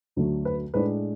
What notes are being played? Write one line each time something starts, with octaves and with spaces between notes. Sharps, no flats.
D2 D3 F#3 A3
B4
A2 G#3 D4 B4